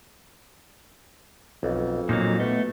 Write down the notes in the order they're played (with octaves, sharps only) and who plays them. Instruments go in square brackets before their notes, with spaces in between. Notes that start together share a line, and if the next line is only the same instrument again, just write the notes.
[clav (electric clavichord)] B1 [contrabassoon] F2
[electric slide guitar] A#2 F#3 [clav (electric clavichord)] A#3 D#4
[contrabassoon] B2 [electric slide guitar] A3